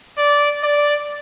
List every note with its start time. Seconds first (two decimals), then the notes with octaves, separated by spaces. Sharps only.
0.18 D5
0.63 D5